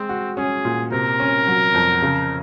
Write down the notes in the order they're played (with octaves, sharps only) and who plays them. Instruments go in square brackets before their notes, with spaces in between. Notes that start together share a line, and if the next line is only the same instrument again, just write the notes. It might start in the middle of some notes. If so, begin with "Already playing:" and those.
Already playing: [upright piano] G#3 [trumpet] C4
[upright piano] F#4
[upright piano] C#4 [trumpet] G#4
[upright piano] A#2
[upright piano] C3 [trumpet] A#4
[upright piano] C#4
F#3
F2
C#3